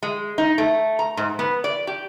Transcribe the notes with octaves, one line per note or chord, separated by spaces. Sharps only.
G#3
D#4
A3
A#5
G#2
B3
D5
G4